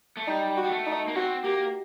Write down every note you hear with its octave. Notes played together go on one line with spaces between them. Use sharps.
A3
G3 D#4
F#4
G3
A3
D#4
A#3
C4 F#4
A#3 G4